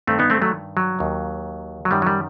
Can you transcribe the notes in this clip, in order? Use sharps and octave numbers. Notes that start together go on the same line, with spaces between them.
G2 D#3 A3 C4
B3 D#4
A3 C4
F#3 A3
F#3
D#2 D#3
F#3
F#2 D#3 G3
F#3
G3